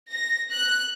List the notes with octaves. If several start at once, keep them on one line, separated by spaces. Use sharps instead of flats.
A#6
F#6